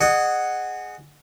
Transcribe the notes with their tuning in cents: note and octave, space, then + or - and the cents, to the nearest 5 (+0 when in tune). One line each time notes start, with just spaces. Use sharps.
G#4 +0 D#5 -35 F#5 +0